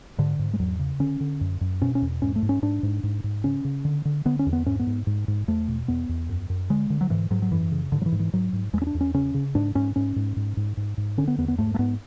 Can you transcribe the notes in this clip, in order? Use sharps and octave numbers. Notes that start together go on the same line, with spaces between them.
G#2 D3
G#2
G#3
E2 F#3
C#3
D3 C#4
D3
F#2
F#2
B2 C#4
C#4
E2
G#2 C#4
A3
G#2
C#4
G#2 D4
G#2
G#2
G#2
C#3 C#4
C#3
D3
D3
D3 B3
C#4
E2
B3
G#2 C#4
B3
G#2
G#2
G#2
E2 A3
B2
E2 B3
E2
F#2
F#2
D3 G#3
D3
F#3
G#2 E3
G#2 F#3
F#3
F#2 E3
C#3
G#2 D3
F#3
E3
G#2
E3
G#2 F#3
G#2
E2 G#3
C#4
D4
E2
C#4
C#3 C#4
C#3
G#2 D4
G#2 C#4
G#2 C#4
G#2
G#2
G#2
G#2
G#2
D3 C#4
B3
E2 B3
B3
G#2 A3
A3
G#2 B3